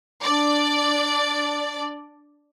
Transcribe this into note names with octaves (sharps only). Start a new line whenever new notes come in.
D4 D5